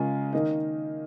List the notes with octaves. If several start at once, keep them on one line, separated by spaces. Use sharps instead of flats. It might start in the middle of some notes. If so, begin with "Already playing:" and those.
Already playing: C#3 G#3 C#4 F4 A#4
D#3 A#3 D#4